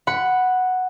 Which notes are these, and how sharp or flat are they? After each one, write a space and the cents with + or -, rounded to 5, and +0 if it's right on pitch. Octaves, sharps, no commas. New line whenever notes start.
F#5 +0 B5 +0